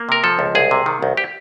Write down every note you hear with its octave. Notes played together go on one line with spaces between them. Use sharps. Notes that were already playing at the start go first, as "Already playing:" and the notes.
Already playing: A#3
C3 A#4
F3 A4
C#2
C2 G#4
C3
D#3
C2
G4